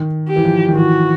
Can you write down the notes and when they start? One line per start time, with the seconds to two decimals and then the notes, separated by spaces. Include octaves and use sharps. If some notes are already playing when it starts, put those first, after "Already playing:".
Already playing: D#3
0.29 G4
0.36 E3
0.45 F3
0.68 D#3
0.76 E3 F#4